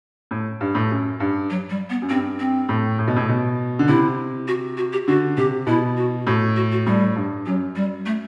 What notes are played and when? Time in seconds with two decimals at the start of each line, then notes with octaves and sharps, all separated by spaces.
0.31 A2
0.61 G2
0.75 A2
0.91 F#2
1.20 G2
1.50 F#3
1.70 G3
1.90 B3
2.02 F#2
2.09 G2 C4
2.39 C4
2.69 A2
2.99 A2
3.08 B2
3.16 A2
3.29 B2
3.79 D3
3.88 C3 E4
4.48 F#4
4.77 F#4
4.93 G4
5.08 D3 F#4
5.37 C3 G4
5.67 B2 E4
5.97 F#4
6.27 A2 F#4
6.56 F#4
6.72 F#4
6.86 A2 G3
7.16 G2
7.46 F#2 F#3
7.76 G3
8.06 A3